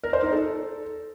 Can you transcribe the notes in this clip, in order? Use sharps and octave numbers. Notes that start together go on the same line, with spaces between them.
A#4
C5
D#4
A4